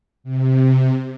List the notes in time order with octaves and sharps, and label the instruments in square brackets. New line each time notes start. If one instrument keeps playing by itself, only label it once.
[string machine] C3